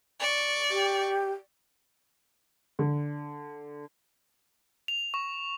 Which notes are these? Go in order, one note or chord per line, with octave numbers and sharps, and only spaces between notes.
D5 C#6
G4
D3
F7
C#6